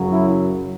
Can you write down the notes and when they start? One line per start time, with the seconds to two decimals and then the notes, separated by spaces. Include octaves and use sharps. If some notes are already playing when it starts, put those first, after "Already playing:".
Already playing: F#2 C#3 F#3
0.12 E4